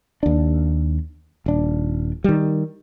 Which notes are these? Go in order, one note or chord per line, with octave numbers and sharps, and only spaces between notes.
D#2 D4
D#1 D4
D#3 G3